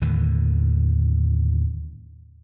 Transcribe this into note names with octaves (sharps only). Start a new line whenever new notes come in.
D#2 A2 D3 D#3